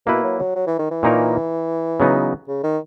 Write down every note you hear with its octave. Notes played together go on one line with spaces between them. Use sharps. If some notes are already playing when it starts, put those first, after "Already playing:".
B2 A#3 E4 B4
F#3
F#3
F#3
E3
D#3
E3
A#2 A#3 D#4 A#4 C#5
C#3 F#3 B3 D#4
C#3
D#3